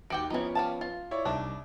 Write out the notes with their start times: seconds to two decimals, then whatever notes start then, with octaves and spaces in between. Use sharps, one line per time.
0.10 D#2 F#4 G4 G5 C#7 D7
0.30 E3 F3 B3 C#4 D#4
0.55 G3 F5 A5
0.81 F4
1.11 E4 C#5 D5
1.25 C2 D4 D#4 D6